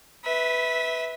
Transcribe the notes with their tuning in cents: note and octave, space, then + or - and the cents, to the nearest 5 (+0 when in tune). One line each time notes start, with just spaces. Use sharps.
B4 +0 E5 -20